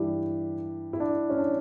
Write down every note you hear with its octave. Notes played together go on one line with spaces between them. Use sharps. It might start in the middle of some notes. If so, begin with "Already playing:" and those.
Already playing: G2 E3 G3 D4 E4 G4
E4
D4
C#4
D4